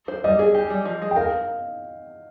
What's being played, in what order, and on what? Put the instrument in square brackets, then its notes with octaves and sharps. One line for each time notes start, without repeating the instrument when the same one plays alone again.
[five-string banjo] C5
[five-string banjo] G3 [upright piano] D#5
[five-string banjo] G#4
G4
G3
F3
G#3
[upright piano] G5
[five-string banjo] A#4 [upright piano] F5